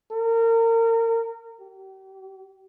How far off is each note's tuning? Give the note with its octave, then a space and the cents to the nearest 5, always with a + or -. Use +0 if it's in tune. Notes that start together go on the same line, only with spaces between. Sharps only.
A#4 -30
G4 -40